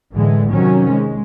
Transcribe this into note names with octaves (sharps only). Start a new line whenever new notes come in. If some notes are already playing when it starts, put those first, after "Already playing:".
A2 D3 E3 G#3
C3 D#3 F#3 C#4
G#3